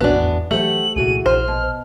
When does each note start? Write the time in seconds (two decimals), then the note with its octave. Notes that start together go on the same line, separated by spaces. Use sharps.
0.01 D#1 A#1 E2 A2 B3 D4 F#4 G#5
0.16 G#1 E2
0.51 E3 F#3 A3 G4 C5 F#5 F#7
0.96 C2 A#2 E3 F#4 G#4 D#7
1.26 A#1 C5 F6
1.48 B2